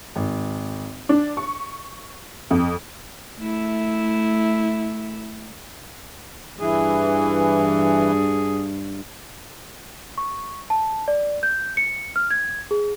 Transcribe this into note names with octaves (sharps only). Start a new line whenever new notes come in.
G#1
D4
C#6
F2
A3 E4
G2 E3 G#4
C#6
A5
D5
G6
C#7
F6
G#6
G#4